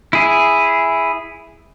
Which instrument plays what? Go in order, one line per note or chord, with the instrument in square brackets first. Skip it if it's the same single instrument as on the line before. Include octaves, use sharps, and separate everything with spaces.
[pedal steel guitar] E4 G#4